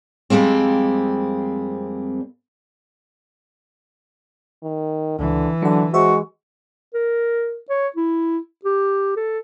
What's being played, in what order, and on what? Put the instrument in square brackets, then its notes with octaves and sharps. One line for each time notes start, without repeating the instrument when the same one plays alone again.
[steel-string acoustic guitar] F2 G3 G#3 A#3 C4
[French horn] D#3
[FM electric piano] C#2 [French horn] D3 [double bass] E3
[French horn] D3 [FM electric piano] F#3 F#5
[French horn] G#3 [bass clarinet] F#4 [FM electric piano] C5 E5
[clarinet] A#4
C#5
E4
G4
A4